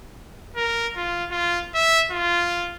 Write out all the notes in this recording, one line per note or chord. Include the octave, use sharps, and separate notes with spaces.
A#4
F4
F4
E5
F4